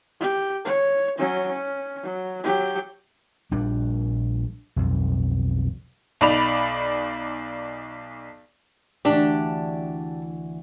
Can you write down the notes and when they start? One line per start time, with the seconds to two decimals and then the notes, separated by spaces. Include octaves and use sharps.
0.20 G4
0.65 C#5
1.18 F#3 C#4
1.49 C#4
2.03 F#3
2.44 F#3 G4
3.51 A#1 G3 D4
4.76 B1 F2
6.21 B1 D#4 D5 B5 F7
9.05 D2 E3 D4 G4 D5